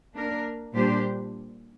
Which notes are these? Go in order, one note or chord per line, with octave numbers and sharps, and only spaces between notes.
A#3 D4 A#4
A#2 G3 D4 G4 C5